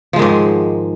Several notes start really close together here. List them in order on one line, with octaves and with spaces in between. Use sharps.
F3 G#3 D#3 G#2